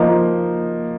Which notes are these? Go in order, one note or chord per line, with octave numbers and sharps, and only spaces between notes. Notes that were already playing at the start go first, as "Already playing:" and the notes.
Already playing: F3 A#3 D#4